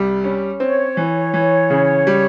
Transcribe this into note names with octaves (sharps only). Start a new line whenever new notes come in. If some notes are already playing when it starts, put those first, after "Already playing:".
Already playing: C2 G3
C#4
C4 C#5
E3
E3
C#3
G3